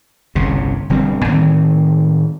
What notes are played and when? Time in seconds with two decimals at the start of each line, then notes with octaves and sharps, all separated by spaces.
0.35 G1 C2 C#3
0.90 E1 D3 G3 C4
1.25 A2 D#3 C4